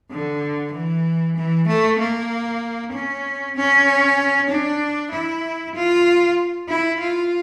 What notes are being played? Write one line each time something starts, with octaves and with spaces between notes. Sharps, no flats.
D3
E3
E3
A3
A#3
C#4
C#4
D4
E4
F4
E4
F4